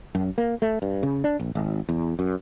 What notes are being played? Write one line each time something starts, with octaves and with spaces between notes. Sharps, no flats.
F#2
A#3
A3
G2
C#3
D4
A#1
G#1
E2
F#2